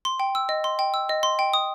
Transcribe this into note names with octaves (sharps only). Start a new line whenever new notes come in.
C6
G5
E6
D#5
C6
G5
E6
D#5
C6
G5
D#6